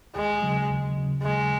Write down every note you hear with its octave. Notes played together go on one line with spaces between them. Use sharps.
D#2 G#3
C#3 F#3
D#2
C#3 F#3
D#2 G#3